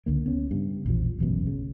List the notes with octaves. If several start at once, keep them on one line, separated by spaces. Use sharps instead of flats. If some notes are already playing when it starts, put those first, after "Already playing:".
C#2 D3 A#3
B3 C#4
G2 C#3
A#1 E2 B2 F3
E1 A1 F#2 B2
C#3